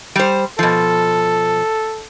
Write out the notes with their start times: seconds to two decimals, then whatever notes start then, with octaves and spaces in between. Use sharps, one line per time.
0.16 G3 C5
0.59 B2 F3 A4